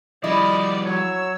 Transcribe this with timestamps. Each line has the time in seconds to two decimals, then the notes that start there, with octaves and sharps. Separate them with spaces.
0.24 F3 G3 E4 D5 D#5
0.86 F#3 C#5 E6